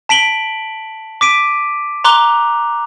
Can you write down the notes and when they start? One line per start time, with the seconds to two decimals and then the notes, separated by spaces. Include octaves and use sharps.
0.09 A5 B6 D7 F#7 G7
1.21 D6 B6 D7 D#7
2.04 A#5 C6 D6 F#6 F7 G7